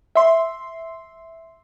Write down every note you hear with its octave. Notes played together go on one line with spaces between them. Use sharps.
E5 C6